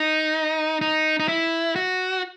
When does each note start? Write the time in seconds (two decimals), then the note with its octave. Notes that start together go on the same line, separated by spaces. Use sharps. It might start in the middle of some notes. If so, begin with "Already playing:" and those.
Already playing: D#4
0.81 D#4
1.20 D#4
1.28 E4
1.76 F#4